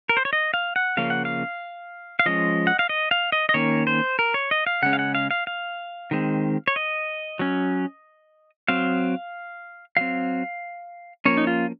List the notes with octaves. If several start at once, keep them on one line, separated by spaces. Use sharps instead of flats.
A#4
C5
C#5
D#5
F5
F#5
C#3 F3 A#3 C#4 F5
F#5
F5
F5
F3 G#3 C#4 D#5
F#5
F5
D#5
F5
D#5
D#5
D#3 A#3 C#4 C#5
C5
A#4
C#5
D#5
F5
C#3 G#3 C#4 F#5
F5
F#5
F5
F5
F5
D#3 G#3 C4
C#5
D#5
F#3 C#4
F#3 C4 F5
F#3 C4 F5
F3 A#3 C#4 C#5
D#4
F4